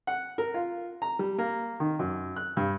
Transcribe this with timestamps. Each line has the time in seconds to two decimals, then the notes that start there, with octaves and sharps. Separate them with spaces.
0.07 F#5
0.38 A#4
0.54 F4
1.02 A#5
1.19 G3
1.38 A#3
1.80 D#3
1.99 F#2
2.36 F#6
2.57 G2